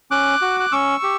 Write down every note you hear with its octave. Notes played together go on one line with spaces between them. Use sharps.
C#4 D6 F#6
F#4
F#6
C#4 C#6 E6
G4